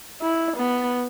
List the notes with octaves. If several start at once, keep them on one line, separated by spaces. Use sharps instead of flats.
E4
B3